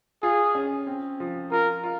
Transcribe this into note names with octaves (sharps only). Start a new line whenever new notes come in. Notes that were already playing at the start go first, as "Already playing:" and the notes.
F4 G#4
C#4
C4
F3
F4 A#4
F4